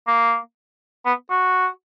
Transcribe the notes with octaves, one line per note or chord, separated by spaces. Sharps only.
A#3
B3
F#4